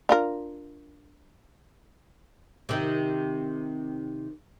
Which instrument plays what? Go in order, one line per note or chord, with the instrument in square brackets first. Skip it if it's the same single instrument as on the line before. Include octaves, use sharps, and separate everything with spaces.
[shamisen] D4 F4 A#4
[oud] C3 D#3